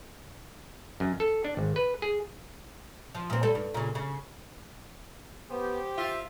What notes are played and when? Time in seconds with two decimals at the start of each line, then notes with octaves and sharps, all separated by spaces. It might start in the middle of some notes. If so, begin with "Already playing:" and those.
1.00 F#2
1.20 A4
1.44 D4
1.57 G#1
1.76 B4
2.02 G#4
3.15 F3
3.30 A#2 C4
3.43 G3 A4
3.55 G2
3.74 A#2 C#3
3.95 C#3
5.50 B3 G4 C5
5.98 F4 E5